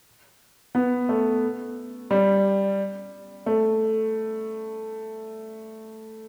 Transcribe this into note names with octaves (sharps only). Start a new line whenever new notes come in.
B3
A3
G3
A3